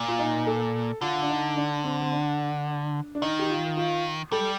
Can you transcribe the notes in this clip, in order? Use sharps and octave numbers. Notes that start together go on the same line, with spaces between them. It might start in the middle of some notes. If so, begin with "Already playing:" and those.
Already playing: A#2
F4
D#4
A4
D3 F4
D4
D#4
D4
C4
C4
D4
D4
D#3 D#4
G4
F4
F4
G3 A4